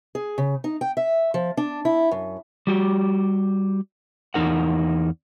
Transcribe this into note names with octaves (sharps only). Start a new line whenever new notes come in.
G#4
C#3
D#4
G5
E5
F3
D4
E4
F#2
G3 F#4 G4
E2 D#4 A#4 F#5